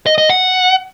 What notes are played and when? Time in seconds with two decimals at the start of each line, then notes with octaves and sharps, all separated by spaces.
0.06 D#5
0.18 D#5
0.29 F#5